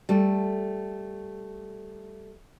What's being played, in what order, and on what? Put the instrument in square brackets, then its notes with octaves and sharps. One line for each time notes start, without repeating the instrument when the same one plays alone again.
[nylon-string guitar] G3 A3